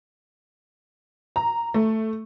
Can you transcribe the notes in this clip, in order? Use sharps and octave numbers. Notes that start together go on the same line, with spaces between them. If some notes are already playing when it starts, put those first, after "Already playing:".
A#5
A3